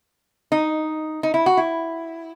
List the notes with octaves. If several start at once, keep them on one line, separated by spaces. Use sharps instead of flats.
D#4
D#4
E4
F#4
E4